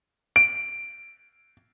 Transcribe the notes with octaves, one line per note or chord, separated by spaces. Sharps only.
D7